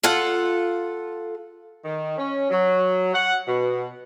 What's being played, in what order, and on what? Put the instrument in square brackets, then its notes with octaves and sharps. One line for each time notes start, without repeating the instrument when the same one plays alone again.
[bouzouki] F4 A4 F#5
[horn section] D#3
C#4
F#3
F#5
B2